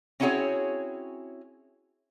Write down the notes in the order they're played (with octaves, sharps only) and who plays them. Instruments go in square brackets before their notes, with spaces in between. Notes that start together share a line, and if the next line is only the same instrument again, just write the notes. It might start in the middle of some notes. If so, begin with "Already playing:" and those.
[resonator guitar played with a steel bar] C4 C#4 E4 F#4 G#4 C#5